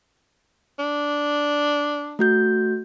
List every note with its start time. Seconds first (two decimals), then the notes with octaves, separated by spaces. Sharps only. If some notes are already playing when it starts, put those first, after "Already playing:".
0.79 D4
2.19 A3 F#4 G6